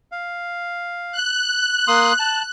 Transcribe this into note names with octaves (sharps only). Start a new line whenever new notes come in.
F5
F#6
A#3 C6 D#6
A5